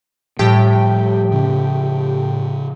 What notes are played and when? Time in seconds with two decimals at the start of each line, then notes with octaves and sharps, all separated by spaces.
0.39 A2 F3 G3 G4 G5
1.32 C#3 F3 C#4